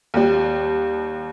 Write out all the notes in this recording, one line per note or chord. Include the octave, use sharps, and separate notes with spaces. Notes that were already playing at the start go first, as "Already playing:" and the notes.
D#2 G3